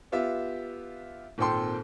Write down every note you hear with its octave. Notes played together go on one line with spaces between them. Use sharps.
B3 F4 G4 E5
G#1 A#2 C4 A4 G5 C6